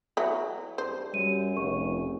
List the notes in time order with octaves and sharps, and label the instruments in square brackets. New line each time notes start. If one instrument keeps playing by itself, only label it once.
[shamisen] E3 F#3 F#4
[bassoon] G2 [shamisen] C5
[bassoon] F#2 [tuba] G3 [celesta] D#7
[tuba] F1 [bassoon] C#2 [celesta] C#6